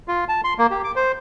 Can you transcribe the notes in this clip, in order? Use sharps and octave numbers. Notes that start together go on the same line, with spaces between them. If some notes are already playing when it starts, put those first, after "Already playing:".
F4
A5
C6
A#3
G4
D6
C5